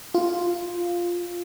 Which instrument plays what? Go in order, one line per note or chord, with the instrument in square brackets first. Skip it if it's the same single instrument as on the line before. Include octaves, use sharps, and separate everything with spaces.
[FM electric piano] F4